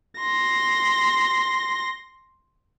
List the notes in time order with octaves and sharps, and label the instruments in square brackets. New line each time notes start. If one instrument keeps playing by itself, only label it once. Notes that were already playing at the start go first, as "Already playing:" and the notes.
[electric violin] C6 A#6